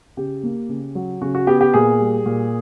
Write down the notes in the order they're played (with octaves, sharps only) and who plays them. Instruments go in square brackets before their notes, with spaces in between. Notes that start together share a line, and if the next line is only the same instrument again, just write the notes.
[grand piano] C#3 G4
A#3
C#3
F#3
C#3 F#4
F#4
B3 G4
G4
A#2 G#4
G3
A#2